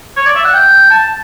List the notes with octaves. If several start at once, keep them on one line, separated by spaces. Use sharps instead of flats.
C#5
D5
E5
F#5
G5
A5